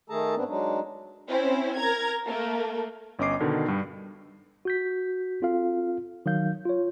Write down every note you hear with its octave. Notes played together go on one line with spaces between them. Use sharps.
D#3 A3 G#4 A4 A5 A#5
G#2 B3 C4 D4
F#3 G#3 D4 D#4
C4 C#4 E4 C5
A#4 A#5 G#6
A3 A#3 A#4
G1 C#4 D#5 D6 C7
B2 D3 D#3
G2 G3
F#4 G6 B6
C4 F4 A4 F5
D#3 F#3 F5 G6
F4 C#5